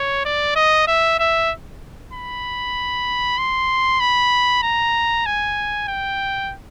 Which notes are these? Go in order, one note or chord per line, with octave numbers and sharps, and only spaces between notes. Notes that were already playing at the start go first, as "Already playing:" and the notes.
Already playing: C#5
D5
D#5
E5
E5
B5
C6
B5
A#5
G#5
G5